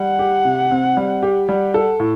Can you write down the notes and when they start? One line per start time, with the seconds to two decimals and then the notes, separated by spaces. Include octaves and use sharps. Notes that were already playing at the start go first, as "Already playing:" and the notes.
Already playing: G3 F#5
0.19 G4
0.45 C3
0.71 C4
0.97 G3
1.22 G4
1.48 G3 F#5
1.74 A4
2.00 A2